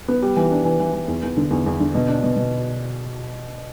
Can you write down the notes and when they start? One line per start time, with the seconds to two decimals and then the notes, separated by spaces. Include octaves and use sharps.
0.08 B3
0.22 G3
0.37 E3
0.51 D4
0.65 E3
0.80 E3
0.93 E3
1.08 E2
1.23 E2
1.37 D3
1.50 E2
1.66 E2
1.80 D3
1.95 B2
2.08 D4
2.23 B2
2.36 B2